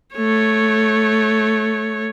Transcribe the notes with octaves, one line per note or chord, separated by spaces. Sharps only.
A3 C#5